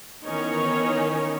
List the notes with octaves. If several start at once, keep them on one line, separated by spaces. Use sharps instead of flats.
D#3 E3 B3 C#4 D#4 C#5